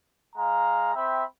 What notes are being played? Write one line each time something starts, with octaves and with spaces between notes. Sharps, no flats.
G#3 F5 A#5
C4 E5 G5 B5